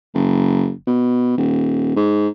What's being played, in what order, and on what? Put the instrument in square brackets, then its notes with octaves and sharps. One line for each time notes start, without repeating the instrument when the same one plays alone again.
[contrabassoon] F#1
B2
D#1
G#2